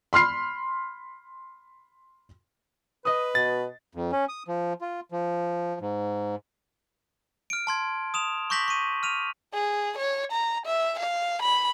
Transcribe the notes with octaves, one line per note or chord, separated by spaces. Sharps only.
B5 C6 F6 C7
B4 D#5 D#6
B2 A6
F2
C#4
D#6
F3
F4
F3
G#2
F6 D7
A5 C6 G#6
D#6 E7 F7
C#6 D6 G6 A#6 B6 F#7
C#6 D#7
F6 D#7 F7
G#4
C#5
A#5
E5
F5
B5